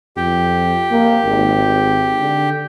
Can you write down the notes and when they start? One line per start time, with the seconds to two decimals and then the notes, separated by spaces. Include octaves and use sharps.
0.17 F2 G4
0.91 A#3
1.25 G#1
2.21 D3